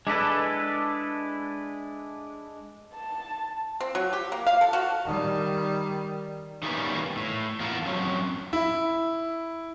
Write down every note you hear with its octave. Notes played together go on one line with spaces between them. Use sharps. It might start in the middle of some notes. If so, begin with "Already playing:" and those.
G#3 D4 E4 A4 B4
A5
C4
F#3
G4
A#3
F5
A4
F#4
D#3 G3
D#3 E3 G3 A#3 B3 C#4
A2
E2 F4 A#4 F5 F#5 A5
F#3 C4 C#4
E4